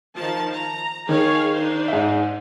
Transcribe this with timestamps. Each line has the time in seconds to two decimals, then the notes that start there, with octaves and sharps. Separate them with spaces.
0.15 D#3 F3 A5
0.53 A#5
1.09 D#3 G#4 C#5 F5
1.54 D4 D#4 C5
1.88 G#2 E5